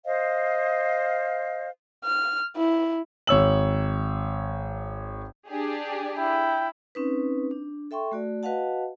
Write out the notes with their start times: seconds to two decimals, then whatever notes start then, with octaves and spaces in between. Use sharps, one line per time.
0.04 C5 D#5 F5
2.04 F6
2.56 E4
3.27 G#1 C#5 E6 F#7
5.48 D4 G4 G#4
6.18 E4 G5
6.95 C4 C#4 D#4 B4
7.51 D4
7.91 A4 E5 G5 C6 C#6
8.12 A3 F#4 D5
8.43 F#4 B4 D#5 F5 F#5 A5